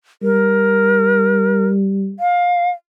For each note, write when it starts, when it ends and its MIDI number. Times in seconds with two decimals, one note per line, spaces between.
0.23 2.14 55
0.23 1.67 70
2.20 2.70 77